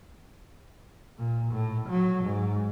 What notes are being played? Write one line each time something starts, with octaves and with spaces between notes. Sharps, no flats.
A#2
A2
F#3
G#2